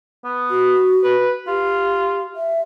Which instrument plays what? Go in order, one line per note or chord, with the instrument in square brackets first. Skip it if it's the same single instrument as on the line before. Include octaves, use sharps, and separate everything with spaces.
[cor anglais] B3
[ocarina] F#4
[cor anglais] B4
[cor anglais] F4 [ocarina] G4
[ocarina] E5